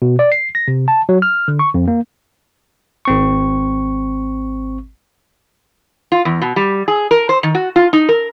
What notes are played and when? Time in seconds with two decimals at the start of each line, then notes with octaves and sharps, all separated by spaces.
0.02 B2
0.19 D5
0.32 C7
0.55 A#6
0.68 C3
0.88 A5
1.09 F#3
1.22 F6
1.48 D3
1.59 C#6
1.74 F2
1.88 A#3
3.05 G#1 C4 C#6
6.12 F4
6.25 E2
6.42 B2
6.56 G3
6.88 G#4
7.11 A#4
7.29 C5
7.43 D#3
7.55 F#4
7.76 F4
7.93 D#4
8.09 A#4